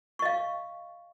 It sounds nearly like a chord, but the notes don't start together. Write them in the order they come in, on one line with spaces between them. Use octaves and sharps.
C#6 D#5 F5